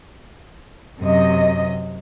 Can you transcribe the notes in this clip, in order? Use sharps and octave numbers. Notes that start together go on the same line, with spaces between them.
F#2 C3 D#5